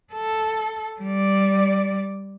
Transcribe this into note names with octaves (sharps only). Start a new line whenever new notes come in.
A4
G3 D5